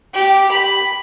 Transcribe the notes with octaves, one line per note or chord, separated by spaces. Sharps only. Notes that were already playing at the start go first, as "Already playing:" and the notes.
G4
B5